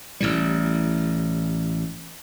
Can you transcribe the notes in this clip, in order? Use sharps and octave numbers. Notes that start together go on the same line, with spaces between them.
A1 A2 G3